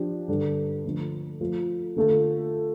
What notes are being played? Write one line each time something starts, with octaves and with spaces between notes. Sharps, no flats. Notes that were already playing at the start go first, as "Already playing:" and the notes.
Already playing: F3 D4 G4
G2 D3 G3 D4
D3 F3 A3 D4
F3 A3 F4
D3 A3 F4 A4